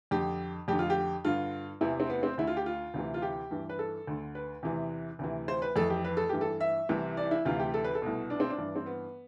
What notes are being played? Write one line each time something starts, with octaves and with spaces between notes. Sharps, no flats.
F2 D3 G4
F2 D3 G4
F4
G4
G2 D3 F4
E2 C3 E3 E4
C4
B3
C4
D2 D3 E4
F4
G4
F4
D2 C3 E3
F4
G4
G2 E3
B4
A4
D2 D3
B4
E2 C3 E3
D2 C3 E3
C5
B4
F2 E3 A4
G4
B4
A4
G2 E3 G4
A4
E5
C2 C3 E3
D5
E4
D2 C3 E3 F4
G4
A4
B4
A4
C2 B2
D4
C4
D4
G2 E3
C4
B3